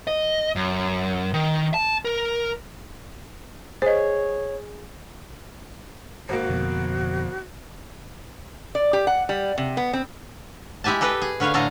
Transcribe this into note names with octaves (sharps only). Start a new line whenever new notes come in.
D#5
F#2
D#3
A5
A#4
G#4 C5 C#5 D#5
G#1 A#3 F#4
F2 B2 D3
D5
G4
F#5
G3
C3
B3
C4
G#3 E4 G4 G#5 A5
G4 A4 B4 D#5 G5
G#4
D3 C#4 B4 C#5 F5
A2 D3 A4 D#5 F5 A#5